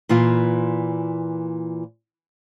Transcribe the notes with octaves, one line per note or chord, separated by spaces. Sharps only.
A#2 E3 F4